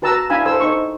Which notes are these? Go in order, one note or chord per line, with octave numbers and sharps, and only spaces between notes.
F#4 B4 A5 A#5 E6
D4 E4 F5 G#5 B5 E6
A4 C5 E6
D#4 A4 C5 C#6